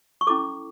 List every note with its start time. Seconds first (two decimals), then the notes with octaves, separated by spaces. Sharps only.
0.21 C#6
0.27 C#4 E4 A4 D6